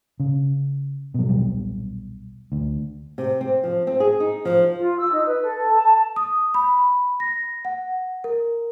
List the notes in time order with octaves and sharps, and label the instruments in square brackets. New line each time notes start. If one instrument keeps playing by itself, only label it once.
[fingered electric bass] C#3
B2 F#3
D#1 B1 G3
D2
[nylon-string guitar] C3
C4
F3
C4
G#4
D#4
F3
[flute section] F4
E6
D#4
B4
A4
A5
[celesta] D#6
B5
A#6
F#5
A#4